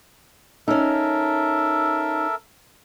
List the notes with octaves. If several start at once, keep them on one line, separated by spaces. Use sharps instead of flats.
C#4 D#4 A4 A#4 E5